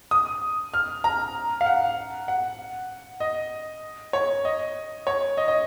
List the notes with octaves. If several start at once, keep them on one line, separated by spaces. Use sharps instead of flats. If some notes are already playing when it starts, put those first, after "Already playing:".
D#6
F6
A#5
F5
F#5
F#5
D#5
C#5
D#5
C#5
D#5
D#5